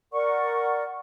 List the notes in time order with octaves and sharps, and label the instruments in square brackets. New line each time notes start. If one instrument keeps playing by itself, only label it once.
[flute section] A#4 D5 F#5 C#6